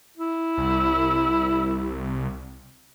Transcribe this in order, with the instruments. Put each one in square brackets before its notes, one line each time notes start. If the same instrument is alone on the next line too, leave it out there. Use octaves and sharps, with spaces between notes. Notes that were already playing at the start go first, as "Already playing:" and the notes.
[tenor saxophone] E4
[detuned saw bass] C2